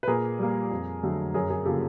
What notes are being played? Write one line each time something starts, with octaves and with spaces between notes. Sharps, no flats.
B4
A#2 G#4 A#4
G3 A#3
F2
D3 F#3 A3
F#2 G#4 A#4
G#4 A#4
C#3 F3 A#3 G4 A4